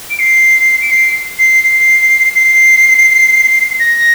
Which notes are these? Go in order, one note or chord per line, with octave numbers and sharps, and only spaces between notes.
D7
C7
D7
C7
C7
C7
C7
A#6